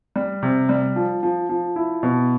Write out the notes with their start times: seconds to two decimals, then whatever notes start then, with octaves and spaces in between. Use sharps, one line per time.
0.16 G3
0.43 C3
0.69 G3
0.96 F3
1.23 F3
1.49 F3
1.76 E4
2.03 B2